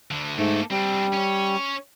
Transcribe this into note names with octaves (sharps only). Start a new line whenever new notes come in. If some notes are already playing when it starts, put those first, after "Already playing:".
D2 D3
G#2 A3 A#3 A4
G3 C4 D4
C#4 C#5